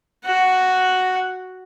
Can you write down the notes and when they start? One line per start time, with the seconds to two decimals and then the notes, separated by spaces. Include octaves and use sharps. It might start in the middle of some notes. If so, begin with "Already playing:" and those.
0.24 F#4 F#5